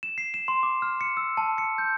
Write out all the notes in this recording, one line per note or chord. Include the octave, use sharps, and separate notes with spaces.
E7
C7
E7
C6
D6
F6
C#7
E6
A5
C#7
G6